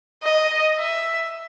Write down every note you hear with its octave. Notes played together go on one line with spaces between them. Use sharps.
D#5
E5